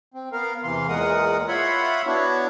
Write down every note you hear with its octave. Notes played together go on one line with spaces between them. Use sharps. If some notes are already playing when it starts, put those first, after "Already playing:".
C4
B3 A#4 F5
E2 C3 E3 F5 C6
E2 A#2 G#3 A#4 F#5 D#6
F4 C#5 E5 F#5 B5 C6
B3 D4 E4 F#4 C#5